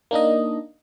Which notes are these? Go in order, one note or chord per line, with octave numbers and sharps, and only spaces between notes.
A#3 D4 D#4 D#5